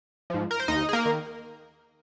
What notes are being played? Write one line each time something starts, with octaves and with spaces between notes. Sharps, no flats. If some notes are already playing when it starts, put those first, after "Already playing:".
G#2 F3
A#4
C5
D#2 D#4 D#5
G#4
A#3 A#4
D#3